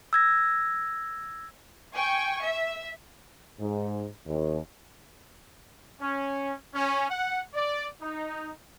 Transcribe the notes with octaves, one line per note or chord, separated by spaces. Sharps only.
E6 G#6 A#6
G5 G#5 C#6
E5
G#2
D#2
C#4
C#4
F#5
D5
D#4